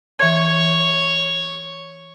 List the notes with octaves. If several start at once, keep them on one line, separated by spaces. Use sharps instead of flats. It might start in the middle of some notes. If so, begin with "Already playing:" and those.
E3 C#5 G#6